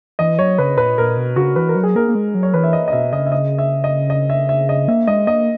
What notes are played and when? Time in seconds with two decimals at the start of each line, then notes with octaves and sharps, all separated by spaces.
0.19 E3 D#5
0.39 F#3 C#5
0.58 C#3 B4
0.78 A#2 B4
0.98 A#2 A#4
1.17 B2
1.36 C#3 F#4
1.56 E3 B4
1.69 A#4
1.75 F#3
1.83 G#4
1.95 A#3 A#4
2.08 A#3
2.15 G#3
2.34 F#3
2.43 C#5
2.54 E3 B4
2.64 E5
2.73 D#5
2.88 D#5
2.92 B2 E5
3.12 C#3 D#5
3.26 E5
3.32 D#5
3.58 E5
3.84 D#5
4.10 D#5
4.30 E5
4.49 E5
4.69 D#5
4.88 A#3 E5
5.07 G#3 D#5
5.27 A#3 D#5